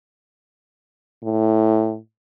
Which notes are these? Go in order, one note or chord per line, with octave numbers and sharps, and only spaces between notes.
A2